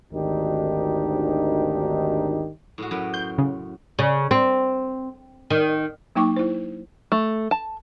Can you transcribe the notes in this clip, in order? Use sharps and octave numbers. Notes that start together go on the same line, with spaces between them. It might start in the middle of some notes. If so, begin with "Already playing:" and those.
G#1 D2 D#3 D4 D#4 G4
A2 G#3 F#4
F#2 A2 B4
C6 G6
C#3
C#3
C4
D#3
F#3 A#3 D#4 G5 C#6 D6
E4 C5
A3
A5